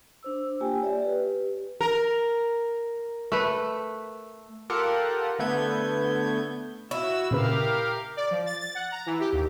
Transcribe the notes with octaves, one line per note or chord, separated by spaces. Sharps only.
D4 C5 E6
A#3 F4 G4 G5 G#5
G4 C#5 D5 E5
G4 B4
A#4
A3 B4
F4 G4 A4 A#4 F#5
D3 A3 B3 G6 G#6
E4 F#4 C#5 F5 E6
A#2 C#3 G4 A#4 B4 F5
D5
F3
A6
A6
F#5
A#5
E3
G4
D#2